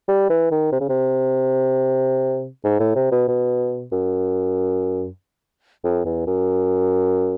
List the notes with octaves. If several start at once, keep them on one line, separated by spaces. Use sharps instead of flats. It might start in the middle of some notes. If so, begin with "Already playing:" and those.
G3
E3
D#3
C3
C#3
C3
G#2
A2
C3
B2
B2
F#2
F2
E2
F#2